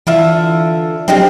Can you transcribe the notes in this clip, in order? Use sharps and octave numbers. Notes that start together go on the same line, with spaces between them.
D3 E3 F4 E5
F3 F#3 G#3 C4 D4 G4